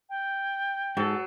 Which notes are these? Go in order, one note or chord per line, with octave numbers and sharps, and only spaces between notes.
G5
G#2 F#3 A4